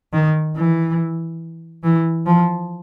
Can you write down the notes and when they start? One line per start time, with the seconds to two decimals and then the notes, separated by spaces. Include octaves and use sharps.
0.13 D#3
0.56 E3
1.83 E3
2.26 F3